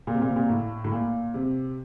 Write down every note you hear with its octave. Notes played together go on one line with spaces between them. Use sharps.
A#2
C3
A#2
C3
A#2
A2
A2
A#2
C3